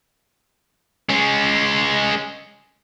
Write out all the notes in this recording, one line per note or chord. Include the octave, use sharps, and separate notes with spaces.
G#3 C#4